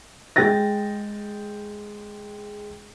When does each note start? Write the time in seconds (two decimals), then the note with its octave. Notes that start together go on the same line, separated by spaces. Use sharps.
0.36 G#3 G#4 G5 A6 A#6